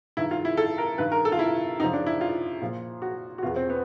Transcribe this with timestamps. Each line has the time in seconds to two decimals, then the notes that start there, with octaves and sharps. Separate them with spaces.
0.17 G2 D#3 E4
0.31 F4
0.45 E4
0.57 A4
0.78 A#4
0.98 G2 D#3 B4
1.12 A#4
1.25 A4
1.32 F4
1.39 E4
1.80 F#2 C#3 F3 D#4
1.93 D4
2.06 E4
2.21 F4
2.62 A#2 F3
3.02 F#4
3.38 F#4
3.43 E2 B2 F4
3.56 C4
3.70 B3